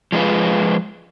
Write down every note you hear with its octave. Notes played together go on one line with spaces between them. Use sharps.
F3 G#3 D4 F4 B4